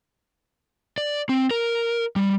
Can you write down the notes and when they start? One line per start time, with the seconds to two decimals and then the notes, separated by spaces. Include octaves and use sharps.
0.98 D5
1.29 C4
1.51 A#4
2.16 G3